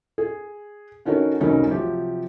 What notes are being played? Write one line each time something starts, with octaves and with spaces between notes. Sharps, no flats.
G#4
D3 C#4 D#4 F#4 A#4 C#5
F1 C#2 C#4 D#4 F#4 A#4
C3 F3 F#3 G4